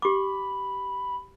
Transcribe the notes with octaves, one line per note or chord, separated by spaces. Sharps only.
G4 B5 D6